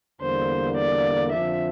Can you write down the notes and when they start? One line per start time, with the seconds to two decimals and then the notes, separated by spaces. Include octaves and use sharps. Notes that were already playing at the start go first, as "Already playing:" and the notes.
0.20 E2 D3 G3 A#3 C5
0.77 D5
1.32 F2 D3 F3 E5